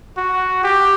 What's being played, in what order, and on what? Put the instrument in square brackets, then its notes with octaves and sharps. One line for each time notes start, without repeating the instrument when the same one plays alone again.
[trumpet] F#4
G4